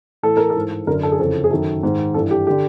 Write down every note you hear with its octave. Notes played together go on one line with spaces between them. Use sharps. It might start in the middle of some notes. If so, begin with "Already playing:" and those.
A2 E3 A4
A#4
A4
G#2 E3
F#2 D3 A#4
A4
G#4
F2 C#3 E3 A4
G#4
F#2 D#3 A4
G#2 D#3
G2 E3 A4
G4
D3 G4